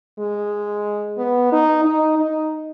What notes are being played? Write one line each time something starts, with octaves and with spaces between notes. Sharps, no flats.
G#3
B3
D#4
D#4
D#4